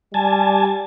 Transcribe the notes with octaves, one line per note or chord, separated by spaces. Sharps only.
G3 G#5 A5